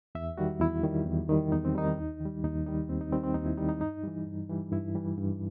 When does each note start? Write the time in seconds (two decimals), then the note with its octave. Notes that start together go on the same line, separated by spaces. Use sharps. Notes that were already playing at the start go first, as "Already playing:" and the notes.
0.15 E2 E5
0.38 D#3 G3 F#4
0.60 E2 E4
0.84 D#3 G3
1.06 E2
1.29 D#3 G3
1.52 E2 D#4
1.65 C4
1.75 D#3 G3 D#4
1.98 D#2
2.21 D#3 G3
2.44 D#2 D#4
2.66 D#3 G3 D#4
2.89 D#2 C4
3.01 D#4
3.12 D#3 G3 C4
3.24 C4
3.34 D#2 D#4
3.46 E4
3.58 D#3 G3 D#4
3.69 D#4
3.81 G2 D#4
4.03 E3 G3
4.27 G2
4.49 E3 G3
4.72 G2 E4
4.95 E3 G3
5.18 G2